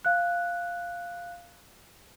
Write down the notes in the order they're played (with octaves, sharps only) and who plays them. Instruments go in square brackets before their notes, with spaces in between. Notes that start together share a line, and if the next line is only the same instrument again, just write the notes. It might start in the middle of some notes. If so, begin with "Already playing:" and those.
[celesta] F5 F#6